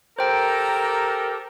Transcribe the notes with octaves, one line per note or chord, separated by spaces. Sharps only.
G4 A4 A#4 C5 G5